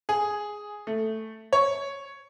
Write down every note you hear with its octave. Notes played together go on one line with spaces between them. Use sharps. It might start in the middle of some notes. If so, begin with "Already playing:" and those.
G#4
A3
C#5